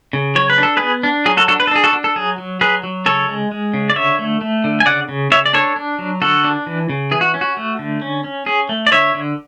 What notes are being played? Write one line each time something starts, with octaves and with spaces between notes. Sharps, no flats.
C#3
F#3 C#5
B4
D4
A4
B3 G#4 B4
D4
F#3 G#4
F#4 A4
D4 F#4 A4
B4
A4
D4 G#4
F#4 A4
D4
A4
F#3 G#4
F#3
F#3 G#4 B4
F#3
C#3 A4 C#5
G#3
G#3
C#3
D5
D3 C#5 E5
A3
A3
D3
G#5
C#3 D5 F#5
C#3
C#3 C#5 E5
D5
D4 A4 C#5
D4
F#3
D3 F#4 A4
D4
E3
C#3
E3 G#4
F#4
C#4
F#4
A3
D3
C#4
C#4
C#4 G#4
A3
D5
D3 C#5 E5
D3